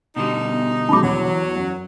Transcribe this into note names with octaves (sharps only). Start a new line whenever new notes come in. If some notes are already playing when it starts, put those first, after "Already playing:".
B2 D3 G3 D#4
B3
D#3 F#3 G#3 A5 B5 D6
E2 F#3
F#2